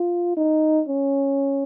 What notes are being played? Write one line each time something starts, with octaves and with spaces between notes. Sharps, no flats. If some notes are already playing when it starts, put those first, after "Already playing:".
Already playing: F4
D#4
C#4